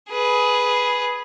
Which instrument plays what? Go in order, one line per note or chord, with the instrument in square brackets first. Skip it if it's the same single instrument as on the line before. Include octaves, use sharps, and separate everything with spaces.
[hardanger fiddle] G#4 B4